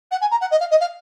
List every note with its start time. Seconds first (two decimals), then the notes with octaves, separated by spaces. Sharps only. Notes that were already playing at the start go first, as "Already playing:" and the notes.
0.11 F#5
0.21 G#5
0.31 A#5
0.41 F#5
0.51 D#5
0.60 F5
0.71 D#5
0.80 F5